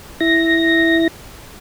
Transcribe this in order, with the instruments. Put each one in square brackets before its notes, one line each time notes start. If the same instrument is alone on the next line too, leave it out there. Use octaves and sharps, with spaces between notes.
[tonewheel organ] E4 A#6